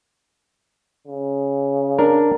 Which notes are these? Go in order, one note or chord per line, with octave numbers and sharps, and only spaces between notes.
C#3
D4 A#4